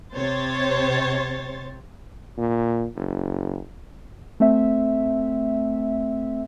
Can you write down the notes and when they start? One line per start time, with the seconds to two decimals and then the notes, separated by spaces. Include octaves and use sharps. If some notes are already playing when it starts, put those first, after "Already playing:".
0.14 C3 C5 C#5 A6
2.38 A#2
2.96 F#1
4.40 A3 C4 E5